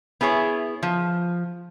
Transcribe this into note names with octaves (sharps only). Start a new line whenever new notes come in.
B3 E4 G#4 C#5
F3